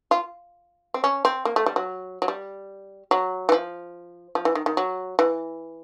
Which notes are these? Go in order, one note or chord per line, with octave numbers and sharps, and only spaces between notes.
F4
C4
C#4
C4
A#3
A3
G3
F#3
F#3
G3
F#3
E3
F3
F3
E3
D#3
D#3
F#3
E3